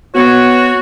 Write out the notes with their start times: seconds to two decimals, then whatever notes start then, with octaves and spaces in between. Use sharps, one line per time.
0.15 B3 F#4 C#5